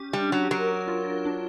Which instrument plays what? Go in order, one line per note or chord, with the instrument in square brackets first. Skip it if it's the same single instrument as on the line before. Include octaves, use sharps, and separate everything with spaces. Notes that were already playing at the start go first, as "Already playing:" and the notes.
Already playing: [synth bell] C#4 G4
[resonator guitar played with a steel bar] G3 [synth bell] D4
[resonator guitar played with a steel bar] F#3
[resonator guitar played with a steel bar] F#3 [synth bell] A#4
[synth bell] F4
D4